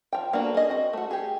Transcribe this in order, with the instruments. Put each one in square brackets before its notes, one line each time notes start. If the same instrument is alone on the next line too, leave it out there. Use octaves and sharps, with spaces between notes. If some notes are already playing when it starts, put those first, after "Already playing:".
[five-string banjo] F3 G5
A#3 B3 D4 F#4 A4
G#4 D#5
C4 F#4
A3 F#4
G4 G#4